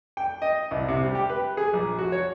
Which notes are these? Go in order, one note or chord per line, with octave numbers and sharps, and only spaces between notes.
G5
D#5
C2
C3
G3
G4
B4
G#4
A#1
F#4
C#5